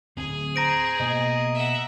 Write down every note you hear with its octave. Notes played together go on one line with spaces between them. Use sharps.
D1 C4 G#4
C5 A#5 A#6 D7
B2 A#3 D#5
E5 F#5